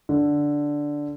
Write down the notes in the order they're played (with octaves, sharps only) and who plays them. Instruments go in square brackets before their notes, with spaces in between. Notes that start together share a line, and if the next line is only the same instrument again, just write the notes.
[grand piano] D3